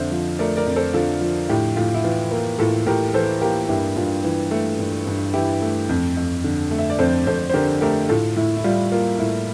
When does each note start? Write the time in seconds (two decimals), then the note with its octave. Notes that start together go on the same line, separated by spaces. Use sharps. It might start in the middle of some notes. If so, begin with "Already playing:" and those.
Already playing: F2 D3 C5 E5
0.12 F3
0.39 A3 A#4 D5
0.57 A#4 D5
0.66 F2
0.76 A4 C5
0.93 D3 F4 A4
1.21 F3
1.48 A2 E4 G4
1.76 A2 F4
1.94 E4
2.04 E3 F4
2.31 A#3
2.59 A2 F4 A4
2.86 A2 G4 A#4
3.14 E3 A4 C5
3.41 A#3 G4 A#4
3.69 G2 E4 G4
3.96 G2 F4
4.24 E3
4.51 A3
4.79 G2
5.07 G2
5.33 E3 E4 G4
5.62 A3
5.89 F2
6.17 F2
6.44 D3
6.71 A3
6.79 E5
6.90 D5
6.99 F2 A4 C5
7.27 F2 A4 C5
7.50 C5
7.54 D3 G4 A#4
7.81 A3 G4 A#4
8.09 A2 F4 A4
8.36 A2 E4
8.57 E4
8.64 G3 F4
8.92 A#3 F4
9.19 A2 E4